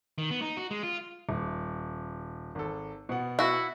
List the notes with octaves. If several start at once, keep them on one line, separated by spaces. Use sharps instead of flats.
D#3
B3
D#4
F#4
G#3
F4
D#1
G#1 A4
B2 B3 F#5
E4 F#4